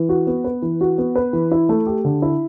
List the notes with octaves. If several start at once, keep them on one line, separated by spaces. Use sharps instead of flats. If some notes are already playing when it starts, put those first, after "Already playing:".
Already playing: E3
F#4
B3
B4
E3
F#4
B3
B4
E3
E4
A3
G4
D3
E4